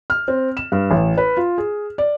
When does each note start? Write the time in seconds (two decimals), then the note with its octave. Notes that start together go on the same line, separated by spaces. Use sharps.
0.10 F6
0.28 C4
0.57 E7
0.72 G2
0.91 A1
1.18 B4
1.37 F4
1.58 G#4
1.98 D5